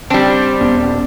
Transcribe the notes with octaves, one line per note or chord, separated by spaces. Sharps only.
G3 C4 D4
D#1 B3 C#4